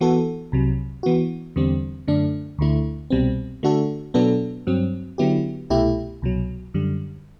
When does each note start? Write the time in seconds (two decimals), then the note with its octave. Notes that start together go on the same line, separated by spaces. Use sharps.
0.01 E3 B3 F#4 A4
0.52 C2 C3 F#3
1.03 E3 B3 F#4
1.56 E2 D3 G3 C4
2.08 F#2 D3 A3 D4
2.59 D2 D3 A3 E4
3.10 C2 B2 G3 C4
3.63 D3 A3 D4 F#4 A4
4.14 B2 F#3 B3 D4 A4
4.67 G2 F#3 C4
5.18 D3 F#3 B3 E4 G4
5.70 C2 B2 A3 E4 G4
6.22 C2 B2 F#3
6.74 F#2 D3 G3